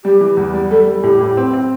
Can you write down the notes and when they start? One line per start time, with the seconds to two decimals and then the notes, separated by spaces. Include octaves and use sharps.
0.05 G3 G4
0.21 E3
0.37 E2
0.54 G3
0.71 G3 A4
0.87 G3
1.03 A2 G4
1.20 A2
1.37 C4
1.53 C4